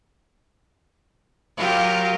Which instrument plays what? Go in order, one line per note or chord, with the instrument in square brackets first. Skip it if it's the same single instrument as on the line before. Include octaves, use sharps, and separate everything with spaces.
[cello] F#3 A#4 [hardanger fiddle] F4 G4